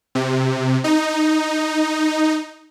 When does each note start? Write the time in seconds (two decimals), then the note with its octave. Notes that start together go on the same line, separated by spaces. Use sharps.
0.15 C3
0.84 D#4